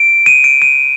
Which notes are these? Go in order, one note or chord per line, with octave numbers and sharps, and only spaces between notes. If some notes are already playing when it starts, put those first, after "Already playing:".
Already playing: D7
D#7
D7
D#7